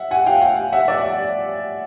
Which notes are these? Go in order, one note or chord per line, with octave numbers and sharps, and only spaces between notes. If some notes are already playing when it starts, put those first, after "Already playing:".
Already playing: E5 F#5
F#5 G#5
F5 G5
F#5 G#5
E5 F#5
D5 E5